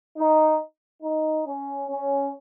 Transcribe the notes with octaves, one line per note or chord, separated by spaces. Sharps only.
D#4
D#4
C#4
C#4